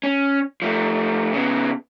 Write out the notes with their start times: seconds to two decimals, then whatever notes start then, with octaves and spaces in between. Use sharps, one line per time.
0.03 C#4
0.62 F3 A3
1.33 C#3 B3